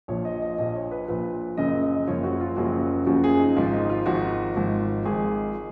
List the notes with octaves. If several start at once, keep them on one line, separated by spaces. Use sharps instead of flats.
A#1 A#2 F3 C#5
D#5
D#5
A#1 A#2 F3 D#5
C#5
B4
A#1 A#2 F3 B4
F#1 F#2 C#3 F3 D#5
D#5
F#1 F#2 C#3 F3 C#5
F#4
F4
F#1 F#2 C#3 F3 F#4
F#1 F#2 C#3 F3 F#4
G#4
D#4
G#1 G#2 F3 F4
D#4
F4
G#1 G#2 F3 F#4
G#1 G#2 F3
G#1 G#2 F3 G#4